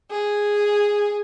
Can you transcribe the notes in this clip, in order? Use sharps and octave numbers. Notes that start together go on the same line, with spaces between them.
G#4